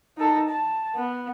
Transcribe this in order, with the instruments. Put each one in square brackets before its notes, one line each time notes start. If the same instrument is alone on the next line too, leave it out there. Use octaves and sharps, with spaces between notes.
[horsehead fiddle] D#4 A4
A5
B3